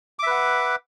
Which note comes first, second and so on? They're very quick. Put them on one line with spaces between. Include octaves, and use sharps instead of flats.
D6 E5 B4 F#5